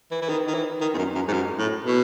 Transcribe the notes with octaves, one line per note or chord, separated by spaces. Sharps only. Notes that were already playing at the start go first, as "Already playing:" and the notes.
E3
E3
D#3
D#3
E3
D#3
E2
F#2
F#2
G#2
F#2
A2
B2